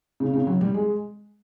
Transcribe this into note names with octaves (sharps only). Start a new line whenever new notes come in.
C#3
C#3
F#3
G3
G#3